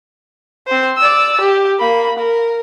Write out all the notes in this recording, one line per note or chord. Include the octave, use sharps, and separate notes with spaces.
C4 C5
D5 E6
G4
A#3 B5
A#4